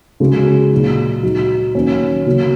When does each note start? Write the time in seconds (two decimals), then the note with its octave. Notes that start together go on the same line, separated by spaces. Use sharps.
0.20 C#3 G#3 F#4
0.72 A#2 F#3 D#4
1.23 F#3 D#4 F#4
1.75 D#3 F#3 A#3 C#4
2.26 C#3 A#3 F#4